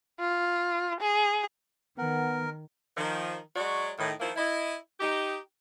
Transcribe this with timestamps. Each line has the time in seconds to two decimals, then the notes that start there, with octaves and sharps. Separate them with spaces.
0.20 F4
1.00 G#4
1.98 D#3 B3 A#4 F#5
2.97 D#3 F3
3.56 F#3 G#3 F#4 C#5 D5
3.98 A2 D#3
4.20 D#3 F3 A#3 E4 F4 C5
4.36 E4 D#5
4.99 D#4 G4